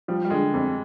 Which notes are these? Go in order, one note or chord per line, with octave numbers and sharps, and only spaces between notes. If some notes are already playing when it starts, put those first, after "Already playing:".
F3 G3
G3
D3 G#3
F2